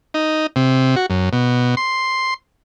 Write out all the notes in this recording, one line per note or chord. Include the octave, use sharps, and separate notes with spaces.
D#4
C3
F#4
F#2
B2
C6